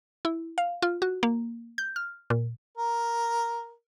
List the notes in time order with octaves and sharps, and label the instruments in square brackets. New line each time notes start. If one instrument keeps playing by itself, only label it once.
[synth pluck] E4
F5
F4
F#4
A#3
G6
F6
A#2
[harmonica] A#4